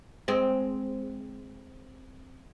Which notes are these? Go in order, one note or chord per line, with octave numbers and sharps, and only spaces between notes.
G#3 C4